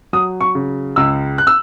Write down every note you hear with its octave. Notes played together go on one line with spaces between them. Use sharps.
F#3 D#6
C#6
C#3
C#2 E6
F#6
E6